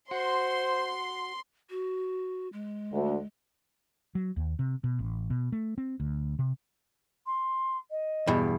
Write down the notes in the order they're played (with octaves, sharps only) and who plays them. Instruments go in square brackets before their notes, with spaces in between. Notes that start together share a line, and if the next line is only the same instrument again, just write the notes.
[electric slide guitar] F#4 [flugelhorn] C5 [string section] C6
[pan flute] F#4
G#3
[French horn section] D2
[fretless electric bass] F#3
D#2
C3
B2
A1
B2
A3
C4
D2
C3
[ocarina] C6
D#5
[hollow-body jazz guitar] E2 G2 B2